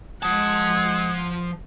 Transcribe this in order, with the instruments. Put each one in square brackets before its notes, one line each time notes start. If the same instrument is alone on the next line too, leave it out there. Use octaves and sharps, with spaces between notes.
[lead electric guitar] F3 A5 [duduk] G#3 [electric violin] F#5 G#6 [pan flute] D#6